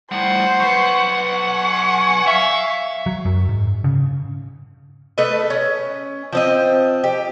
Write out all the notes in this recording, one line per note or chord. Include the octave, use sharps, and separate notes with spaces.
A2 G3 C5 F#5
F#3 B4 C#6
G#5
E5 F5
F#3
F#2
G#2
C#3
A3 A4 B4 D#5
C#4
F3 C4 D#5
G4